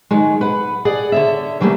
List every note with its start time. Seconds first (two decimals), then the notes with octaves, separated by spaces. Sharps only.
0.11 D#3 F#3 G#3
0.41 B4 F#5
0.85 G#4 D5 F#5
1.12 D3 C#5 E5
1.61 E3 F#3 G3 A3 A#3